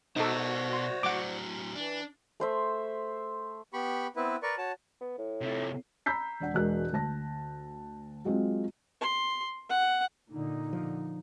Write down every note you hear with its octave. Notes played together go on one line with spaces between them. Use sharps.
B2 D#4 F#4 A4 C5 D5
C6
A2 F#3 F#5 D6
E3 D4
A3 C5 E5
B3 G4 B5 C#6
B3 C4 E4 B4
A#4 B4 D5 C#6
F#4 C#5 A5
B3
A2
C3 A3
A#5 B5 E6 G6 B6 C7
E1 D4 F#5
E1 G#3 F#4 A#4 F#6
D2 A5 A#6
F#3 G#3 C4 F4
C6
F#5
A#2 D3 D#4
F3